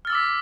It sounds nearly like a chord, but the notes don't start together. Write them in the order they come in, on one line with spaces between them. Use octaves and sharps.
F6 A6 E6 D6 B6